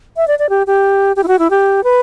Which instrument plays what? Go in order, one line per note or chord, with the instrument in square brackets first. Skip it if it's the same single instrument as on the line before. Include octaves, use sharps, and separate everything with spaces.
[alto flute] E5
D5
D5
G4
G4
G4
E4
F#4
E4
G4
B4